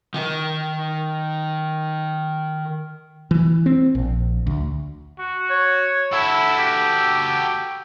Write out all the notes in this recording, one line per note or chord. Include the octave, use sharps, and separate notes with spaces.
D#3 G5
E3
C4
A#1
D2
F#4
C#5
E4 F#4 A4 E6
G4